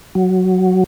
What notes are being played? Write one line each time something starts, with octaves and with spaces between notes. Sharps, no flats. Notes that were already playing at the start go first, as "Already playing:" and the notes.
F#3